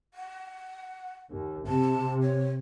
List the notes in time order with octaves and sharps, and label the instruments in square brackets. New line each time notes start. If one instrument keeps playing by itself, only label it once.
[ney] F#5
[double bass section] D#2
[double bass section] C3 [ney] A5
[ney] C#5